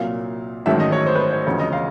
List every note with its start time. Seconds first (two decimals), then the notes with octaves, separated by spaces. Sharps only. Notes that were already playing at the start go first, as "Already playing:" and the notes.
Already playing: C2 A#2 F#3 F5
0.66 A1 G#2 D#3 F#3 A3 E5
0.80 D#5
0.92 C#5
1.06 C5
1.15 B4
1.20 C5
1.33 C#5
1.46 E1 D2 C#3 F3 C#5
1.59 D#5
1.73 F5